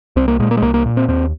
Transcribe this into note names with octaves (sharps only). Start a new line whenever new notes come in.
C2 C4
A#3
A#2 G#3
A#3
G#3
C2 A#3
A#3
A#2
C4
D#2 C4